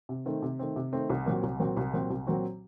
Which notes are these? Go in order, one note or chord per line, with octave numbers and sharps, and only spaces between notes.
C3
D#3 A3 C4
C3
D#3 A3 C4
C3
D#3 A3 C4
C2
A#2 F#3 C4 F#4
C2
A#2 F#3 C4 F#4
C2
A#2 F#3 C4 F#4
C2
A#2 F#3 C4 F#4